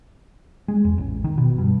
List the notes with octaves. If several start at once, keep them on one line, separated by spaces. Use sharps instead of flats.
G#3
E2
A1
D#3
B2
G2